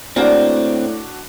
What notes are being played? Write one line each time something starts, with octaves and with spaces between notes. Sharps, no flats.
A2 A#3 C4 D4 F#4 D5